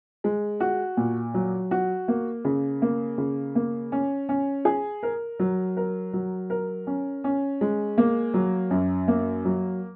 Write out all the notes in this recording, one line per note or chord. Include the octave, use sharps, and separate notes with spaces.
G#3
F#4
A#2
F#3
F#4
A#3
C#3
A#3
C#3
A#3
C#4
C#4
G#4
A#4
F#3
A#4
F#3
A#4
C#4
C#4
G#3
A#3
F#3
F#2
A#3
F#3